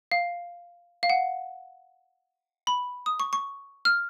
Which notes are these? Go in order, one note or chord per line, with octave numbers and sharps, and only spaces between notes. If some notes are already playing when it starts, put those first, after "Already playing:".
F5
F5
F#5
B5
D#6
C#6
C#6
F6